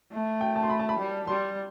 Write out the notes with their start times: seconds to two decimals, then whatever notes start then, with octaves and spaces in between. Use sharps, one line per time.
0.12 A3
0.41 G5
0.56 A5
0.63 C6
0.70 B5
0.80 A5
0.89 B5
0.99 G3
1.27 G3 C6